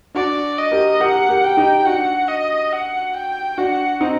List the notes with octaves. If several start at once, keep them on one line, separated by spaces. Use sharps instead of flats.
D4 F#4 D5
D#5
G4 A#4
G4 A#4 F#5
G4 A#4
G5
D#4 G4
D4 F#4 F#5
D#5
F#5
G5
D4 F#4 F#5
C4 D#4